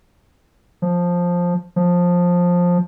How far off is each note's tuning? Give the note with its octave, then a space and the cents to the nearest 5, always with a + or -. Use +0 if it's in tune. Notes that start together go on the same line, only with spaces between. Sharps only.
F3 +10
F3 +15